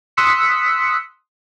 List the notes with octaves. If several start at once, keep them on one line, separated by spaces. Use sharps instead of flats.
C6 D#6 E6 F#6 B6 C#7